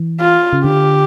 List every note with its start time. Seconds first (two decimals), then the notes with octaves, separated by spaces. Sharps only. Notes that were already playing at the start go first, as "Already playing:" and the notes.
Already playing: E3
0.20 F4
0.53 C#3
0.64 D3 G4